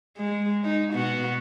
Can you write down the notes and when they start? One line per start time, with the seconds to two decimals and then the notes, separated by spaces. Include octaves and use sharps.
0.17 G#3
0.64 D#4
0.93 B2 B3 F#4